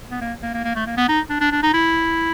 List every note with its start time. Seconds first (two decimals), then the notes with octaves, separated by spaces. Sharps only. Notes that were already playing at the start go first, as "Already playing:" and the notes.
0.11 B3
0.21 A#3
0.43 A#3
0.54 A#3
0.65 A#3
0.76 A3
0.87 A#3
0.97 B3
1.09 D#4
1.30 D4
1.41 D4
1.52 D4
1.63 D#4
1.74 E4